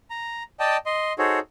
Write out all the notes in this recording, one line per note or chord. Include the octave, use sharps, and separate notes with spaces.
A#5
D5 D#5 G5 A5
D#5 C6
D#4 F#4 G#4 A4 C5 C#5